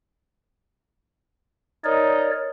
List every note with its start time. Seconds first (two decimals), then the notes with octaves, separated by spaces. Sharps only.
1.85 D#4 A#4 C#5 D5